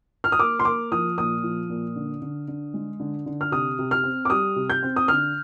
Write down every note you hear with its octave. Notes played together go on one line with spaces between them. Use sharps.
F6
D#6
A#3 D6
C6
A#3 D6
F3 D#6
A#2 D#6
F3
A#2
D3
D3
D3
G#3
D3
D3
F6
C3 D#6
C3
F6
C4
D6
G3 D#6
C3
G6
C4
D#6
D3 F6